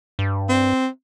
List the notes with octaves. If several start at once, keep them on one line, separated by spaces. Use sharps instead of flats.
G2
C4